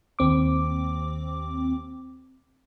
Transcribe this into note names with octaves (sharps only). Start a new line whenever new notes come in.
D#2 C4 D6